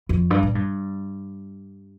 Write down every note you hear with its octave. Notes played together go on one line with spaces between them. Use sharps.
F2
G2
A2
G2